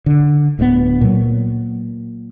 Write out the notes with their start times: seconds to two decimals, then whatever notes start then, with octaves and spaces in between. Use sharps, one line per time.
0.06 D3
0.59 D1 D2 G3 B3
1.01 A#2 F#3